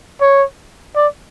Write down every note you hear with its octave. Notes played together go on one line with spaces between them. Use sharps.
C#5
D5